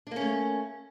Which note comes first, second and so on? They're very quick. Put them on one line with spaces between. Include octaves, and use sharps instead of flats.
D4 A#3 C#4 A3